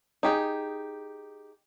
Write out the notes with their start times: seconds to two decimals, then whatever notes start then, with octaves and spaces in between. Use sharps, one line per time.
0.23 D#4 G4 G#4